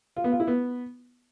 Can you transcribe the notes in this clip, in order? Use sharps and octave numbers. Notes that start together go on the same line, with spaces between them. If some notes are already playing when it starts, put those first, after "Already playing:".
F4
B3
F4
E4
B3